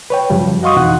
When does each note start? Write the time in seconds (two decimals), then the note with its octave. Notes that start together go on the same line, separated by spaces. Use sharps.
0.10 B4 C#5 G5
0.30 F#2 C#3 F3 G3
0.63 F#4 D#5 F5 C6 C#6 D#6
0.76 F2 B2 E3 D#4 F#5 F#6